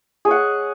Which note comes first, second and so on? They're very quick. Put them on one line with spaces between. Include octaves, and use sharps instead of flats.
G#4 C#5 F#5